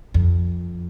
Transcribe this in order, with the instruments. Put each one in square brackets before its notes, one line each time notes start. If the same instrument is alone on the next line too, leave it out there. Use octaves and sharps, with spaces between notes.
[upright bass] F2